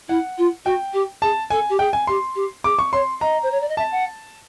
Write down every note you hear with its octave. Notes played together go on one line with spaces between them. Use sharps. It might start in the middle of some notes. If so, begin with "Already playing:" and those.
E4 F#5
F4
F#4 G5
G4
G#4 A5
A4 G#5
G4
G#4 G5
G#5
G4 C6
G4
G#4 D6
C#6
C#5 C6
D#5 A#5
C5
C#5
D5
D#5
E5 A5
F#5